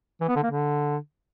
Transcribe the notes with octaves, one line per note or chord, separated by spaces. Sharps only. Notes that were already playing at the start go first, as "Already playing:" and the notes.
E3
B3
D3
A#3
D3